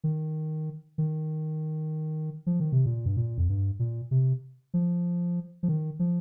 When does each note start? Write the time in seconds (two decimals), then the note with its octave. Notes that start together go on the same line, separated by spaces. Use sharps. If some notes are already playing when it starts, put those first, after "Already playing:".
0.04 D#3
0.98 D#3
2.47 F3
2.60 D#3
2.72 C3
2.86 A#2
3.06 G2
3.17 A#2
3.38 F2
3.49 G2
3.79 A#2
4.11 C3
4.74 F3
5.63 F3
5.68 D#3
5.99 F3